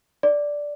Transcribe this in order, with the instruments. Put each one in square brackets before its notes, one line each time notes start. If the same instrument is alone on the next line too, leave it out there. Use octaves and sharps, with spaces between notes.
[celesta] D5